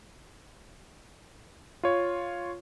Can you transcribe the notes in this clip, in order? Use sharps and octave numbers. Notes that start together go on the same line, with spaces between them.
F4 C#5